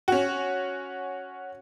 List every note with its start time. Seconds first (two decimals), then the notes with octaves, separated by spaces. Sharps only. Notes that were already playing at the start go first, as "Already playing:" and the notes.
0.08 C#4 F#4